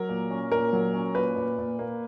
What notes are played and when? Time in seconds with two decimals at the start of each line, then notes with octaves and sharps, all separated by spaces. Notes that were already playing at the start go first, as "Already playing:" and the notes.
Already playing: F#3 A#4
0.09 A#2
0.31 C#4
0.51 A#2 A#4
0.73 F#3
0.94 C#4
1.15 A#2 B4
1.36 A#2
1.58 A#2
1.79 A#3